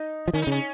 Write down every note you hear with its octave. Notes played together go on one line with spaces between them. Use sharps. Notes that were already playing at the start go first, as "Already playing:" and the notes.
Already playing: D#4
F3
D#3 C#4
D#4
C#3 C#4